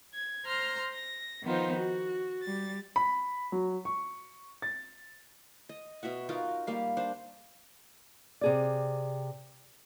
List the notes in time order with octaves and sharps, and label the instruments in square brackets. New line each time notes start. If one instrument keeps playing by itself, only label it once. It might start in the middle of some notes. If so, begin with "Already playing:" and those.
[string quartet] G#6
C5 A#5 C6 F6
A#6
D#3 F3 B3 D#4 F4 C5
F#4
G3 A6
[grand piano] B5
F#3
C#6
A6
[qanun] D#5
B2 F#4 E5 F#5
D#4 F4 F#4 A#4
G3 A#3 F5
D4 C5
[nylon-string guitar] C3 G#4 D5